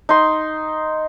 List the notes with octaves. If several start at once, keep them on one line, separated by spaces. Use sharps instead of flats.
D#4 C6